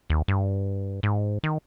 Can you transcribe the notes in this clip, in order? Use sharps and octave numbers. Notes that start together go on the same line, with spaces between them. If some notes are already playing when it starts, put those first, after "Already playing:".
D#2
G2
G#2
D#3